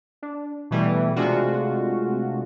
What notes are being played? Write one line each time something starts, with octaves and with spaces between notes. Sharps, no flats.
D4
B2 E3 G3 A3
C3 G#3 A3 D4 F4 F#4